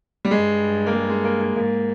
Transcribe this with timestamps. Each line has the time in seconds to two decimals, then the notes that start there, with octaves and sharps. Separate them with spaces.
0.25 G3
0.31 G2 G#3
0.86 A#3
0.94 G#3
1.09 G#3
1.24 A#3
1.41 A#3
1.56 G#2 A#3